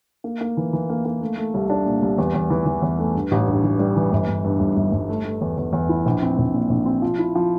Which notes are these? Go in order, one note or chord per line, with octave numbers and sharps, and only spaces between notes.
A#3
A#3
E3
E3
A#3
A#3
A3
A3
C2
D4
A#2
C2
E2
E2
E3
E3
E2
A3
G2
A1
G2
E3
G3
E3
G1
G1
G2
G1
G1
G1
A3
A3
E2
E2
E2
E4
A#1
C4
A#1
A#2
A#1
C4
F3
E4
F3